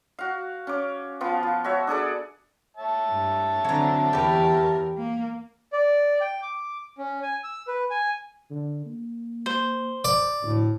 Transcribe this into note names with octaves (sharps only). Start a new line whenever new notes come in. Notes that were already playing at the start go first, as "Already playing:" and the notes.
F#4 F5
C#4 D6
F3 B3 F4
F3
F#4 C#5 E5
D4 G#4 A4 D5
C#5 E5 A5
G2
D3 F#3 C4 A#5
E2 G4 A#4 B4
A#3
D5
G5
D6
C#4
G#5
E6
B4
G#5
D3
A#3
C5
D5
D2 A2